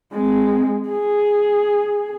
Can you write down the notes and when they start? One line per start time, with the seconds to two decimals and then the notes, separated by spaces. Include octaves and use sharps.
0.12 G#3 C4
0.89 G#4